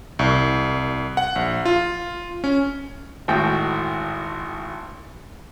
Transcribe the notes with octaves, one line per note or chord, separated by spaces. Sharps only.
C2
F#5
A#1
F4
C#4
G#1 A2 F#4 G5